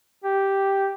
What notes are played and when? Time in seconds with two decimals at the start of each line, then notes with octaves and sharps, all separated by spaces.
0.24 G4